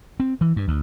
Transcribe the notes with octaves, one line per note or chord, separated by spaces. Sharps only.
C4
E3
G2
D2